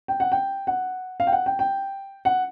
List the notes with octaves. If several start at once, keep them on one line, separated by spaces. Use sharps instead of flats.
G5
F#5
G5
F#5
F5
G5
F#5
G5
G5
F#5